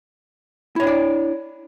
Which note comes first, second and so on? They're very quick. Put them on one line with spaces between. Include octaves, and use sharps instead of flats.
E4 C#5 D4 D5